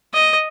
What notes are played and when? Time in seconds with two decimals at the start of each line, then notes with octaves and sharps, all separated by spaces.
0.14 D#5